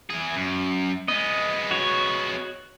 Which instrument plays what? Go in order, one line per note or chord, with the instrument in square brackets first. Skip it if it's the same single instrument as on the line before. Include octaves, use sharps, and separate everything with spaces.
[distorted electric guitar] E3 G#4
F#2
[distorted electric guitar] G#3 B3 [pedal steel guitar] D#5
[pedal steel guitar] F#4 C#5